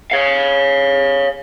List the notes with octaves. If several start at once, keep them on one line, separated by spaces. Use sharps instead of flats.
C#5 F5